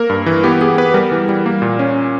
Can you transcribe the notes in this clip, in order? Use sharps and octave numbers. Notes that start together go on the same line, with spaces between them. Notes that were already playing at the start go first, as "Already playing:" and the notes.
Already playing: A#3 A#4
G2
E3
B3 G4
B3 G#4
B3 B4
G3 A#4
E3
G3
A#3
A#2
C#4